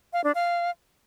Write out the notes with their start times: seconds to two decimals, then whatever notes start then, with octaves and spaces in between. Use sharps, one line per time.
0.13 F5
0.24 D4
0.35 F5